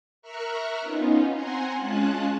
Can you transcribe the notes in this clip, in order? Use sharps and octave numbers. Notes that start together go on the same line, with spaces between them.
A#4 E5 A#5 C#6 F6 F#6
B3 C#4 D#4 F4
C4 F#5 G#5 A#5 C6
G#3 C#4 F4 G#4 A5 F#6